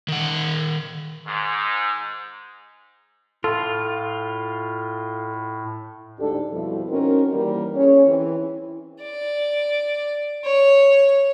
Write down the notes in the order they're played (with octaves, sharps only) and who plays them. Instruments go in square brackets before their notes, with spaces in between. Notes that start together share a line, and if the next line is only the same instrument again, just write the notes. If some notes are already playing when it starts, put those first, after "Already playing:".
[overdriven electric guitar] D#3 F#5
[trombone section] G#2
[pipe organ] A2 [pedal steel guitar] F4 [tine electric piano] A4
[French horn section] D2 G#2 D4 G4 A4
F2 B2 F3 G3 E4 A4
C4 C#4 D#4 F#4 A#4
D#2 E3 G3 A#3 A#4
C#4 G#4 C#5
E3 C4
[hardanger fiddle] D5
C#5